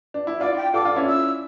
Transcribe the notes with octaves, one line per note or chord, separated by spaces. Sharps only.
D4
E4
D4 F4 D5
G5
F4 A4 D6
D4 F4
C#4 E4
E6